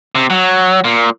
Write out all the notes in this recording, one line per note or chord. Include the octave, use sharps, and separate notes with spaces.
C3
F#3
A#2